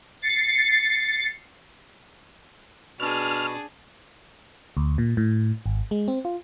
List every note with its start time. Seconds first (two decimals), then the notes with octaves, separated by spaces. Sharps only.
0.22 A6 C7 C#7
3.00 B2 D4 G#4 F6
4.77 D2
4.98 A#2
5.17 A2
5.66 G#1
5.91 G#3
6.08 C4
6.25 F4